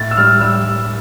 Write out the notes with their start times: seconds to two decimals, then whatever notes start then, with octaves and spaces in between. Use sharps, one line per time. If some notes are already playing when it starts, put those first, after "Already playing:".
Already playing: A2 A6
0.11 E6
0.17 G3 F6
0.40 G3 E6